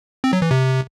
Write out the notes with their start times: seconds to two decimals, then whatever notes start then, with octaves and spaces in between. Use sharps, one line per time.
0.24 C4
0.33 F#3
0.42 E3
0.51 C3